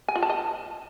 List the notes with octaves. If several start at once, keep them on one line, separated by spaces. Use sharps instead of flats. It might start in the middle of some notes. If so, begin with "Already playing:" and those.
G#5
F4
A5
D#5